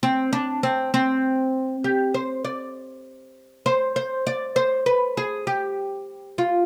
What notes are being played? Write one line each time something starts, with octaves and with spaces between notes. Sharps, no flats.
C4
D4
C4
C4
G4
C5
D5
C5
C5
D5
C5
B4
G#4
G4
F4